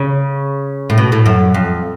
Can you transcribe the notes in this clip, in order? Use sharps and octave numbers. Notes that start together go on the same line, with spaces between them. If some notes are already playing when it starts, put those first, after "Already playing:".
Already playing: C#3
A2
B2
A2
F#2
F2